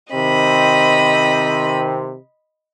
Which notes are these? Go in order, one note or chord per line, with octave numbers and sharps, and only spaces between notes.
C3 D#3 C4 D#5 B5